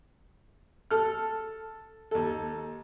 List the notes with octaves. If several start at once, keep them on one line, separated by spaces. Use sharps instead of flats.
A4 F6
D#2 A4